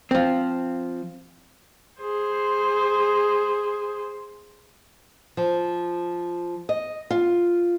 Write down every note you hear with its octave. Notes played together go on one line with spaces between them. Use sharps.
F3 C4
G#4 C5
F3
D#5
F4